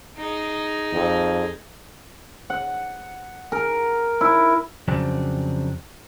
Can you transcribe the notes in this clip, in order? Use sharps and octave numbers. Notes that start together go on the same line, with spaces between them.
D#4 G#4
F2
F#5
A#4
E4
F2 C#3 F#3 C4 D4